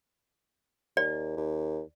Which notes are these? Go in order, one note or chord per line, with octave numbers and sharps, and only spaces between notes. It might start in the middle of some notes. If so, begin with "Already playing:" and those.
D#2 D5
D#2